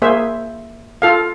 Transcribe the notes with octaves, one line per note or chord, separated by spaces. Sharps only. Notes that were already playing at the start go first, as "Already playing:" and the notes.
A#3 G#4 C5 E5
F4 A4 F5